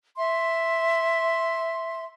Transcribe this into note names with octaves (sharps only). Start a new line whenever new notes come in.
E5 C6